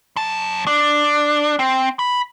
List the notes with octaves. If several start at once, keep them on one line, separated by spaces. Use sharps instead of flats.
F#2 A5
D4
C4
B5